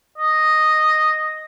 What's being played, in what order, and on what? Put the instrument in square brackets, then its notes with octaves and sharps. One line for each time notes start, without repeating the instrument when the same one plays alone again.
[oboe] D#5